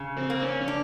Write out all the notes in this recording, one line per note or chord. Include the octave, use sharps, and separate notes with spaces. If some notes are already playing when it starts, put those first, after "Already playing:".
Already playing: C#3
C4
A#3
C#4
C#4
D4